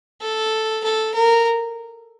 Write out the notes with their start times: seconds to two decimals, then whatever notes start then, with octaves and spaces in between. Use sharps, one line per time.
0.21 A4
0.84 A4
1.14 A#4